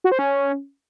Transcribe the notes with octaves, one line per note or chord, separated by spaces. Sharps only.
F#4
C5
C#4